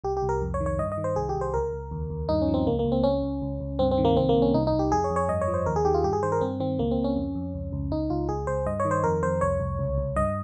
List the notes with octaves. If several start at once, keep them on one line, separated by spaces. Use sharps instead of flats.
C2 G4
G4
C2
A#4
F2
C#5
D#3
C#5
G2 D#5
D#5
D#3
C5
C2 G#4
G4
C2
C5
C#2 A#4
C#2
D#2
D#2
G2 D#4
C#4
F3
C4
C#2 A#3
A#3
C#2
C4
C#2 C#4
C#2
C#2
C#2
G2 C4
C4
D#3
A#3
C2 C4
A#3
C2
C#4
C2 D#4
D#4
C2
G4
F2 G#4
C#5
F2
C#5
G2 D#5
C#5
F3
C5
D#2 A#4
G#4
D#3 G4
F4
G2 G4
G#4
D#3 C5
A#4
G2 C4
D#3 C4
C#2 A#3
C4
C#2
C#4
F2
F2
C#2
C#2
C#2 D#4
C#2 F4
C#2 G#4
C#2 C5
G2 D#5
C#5
D#3
C5
F2 A#4
F2 C5
C2 C#5
C2
C#2
C#2
G2 D#5